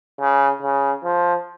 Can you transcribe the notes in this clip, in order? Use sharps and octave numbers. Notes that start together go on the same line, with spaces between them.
C#3
C#3
F3